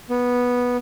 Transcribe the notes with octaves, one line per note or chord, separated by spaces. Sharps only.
B3